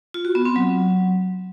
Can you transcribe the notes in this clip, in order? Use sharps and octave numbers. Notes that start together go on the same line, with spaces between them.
F4
F#4
B3
C4
F#3